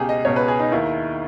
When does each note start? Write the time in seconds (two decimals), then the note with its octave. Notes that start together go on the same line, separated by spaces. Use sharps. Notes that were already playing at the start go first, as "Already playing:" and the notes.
Already playing: C#2 B2 G4 G#4
0.09 D#5
0.25 C#2 B2 C#5
0.36 B4
0.48 G#4
0.60 D#4
0.72 D#2 D#3 E4